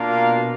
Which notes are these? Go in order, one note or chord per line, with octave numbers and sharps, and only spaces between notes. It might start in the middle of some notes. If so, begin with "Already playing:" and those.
Already playing: B2 A#3 D4 F4 A#4 F5